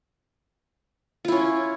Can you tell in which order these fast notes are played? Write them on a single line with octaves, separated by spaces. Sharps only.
F4 E4 C#4